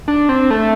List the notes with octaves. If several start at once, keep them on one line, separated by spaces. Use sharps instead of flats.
D4
C4
A3